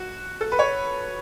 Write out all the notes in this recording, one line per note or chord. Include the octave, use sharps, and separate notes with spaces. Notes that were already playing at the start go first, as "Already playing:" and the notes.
Already playing: F#4
A4
B4
C#5